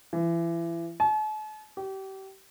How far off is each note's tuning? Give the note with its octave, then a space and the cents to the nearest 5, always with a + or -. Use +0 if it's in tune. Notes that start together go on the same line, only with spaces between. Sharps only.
E3 +30
A5 -45
G4 -30